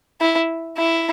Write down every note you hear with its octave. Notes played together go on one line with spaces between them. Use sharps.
E4
E4